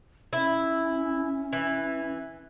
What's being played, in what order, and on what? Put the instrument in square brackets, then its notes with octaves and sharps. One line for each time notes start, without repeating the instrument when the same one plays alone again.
[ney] C#4 [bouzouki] E4
[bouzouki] E3